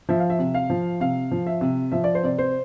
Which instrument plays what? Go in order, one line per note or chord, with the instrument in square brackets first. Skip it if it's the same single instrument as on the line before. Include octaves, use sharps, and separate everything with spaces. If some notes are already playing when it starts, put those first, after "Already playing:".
[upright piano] F3 E5
F5
E5
C3
F5
F3
C3 F5
F3
E5
C3
F3 E5
D5
C5
C3 D5
C5